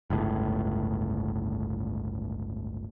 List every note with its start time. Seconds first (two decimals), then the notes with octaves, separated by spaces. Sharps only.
0.10 G1 C#2 A2